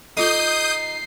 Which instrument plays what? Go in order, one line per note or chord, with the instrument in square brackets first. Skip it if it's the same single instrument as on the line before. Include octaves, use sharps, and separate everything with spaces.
[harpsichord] D#4 [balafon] F4 A4 [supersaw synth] D#6 G6 [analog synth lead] C7